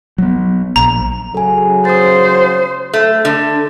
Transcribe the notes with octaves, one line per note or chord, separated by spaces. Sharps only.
F#3 B3
A#1 A#5
C#3 F#3 A4 G#5
C5 D#6 A6
A3
D3